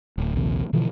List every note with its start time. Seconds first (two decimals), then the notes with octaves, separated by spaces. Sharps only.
0.18 D1
0.36 A#1 D#2 C3
0.73 B2 D3 E3 F3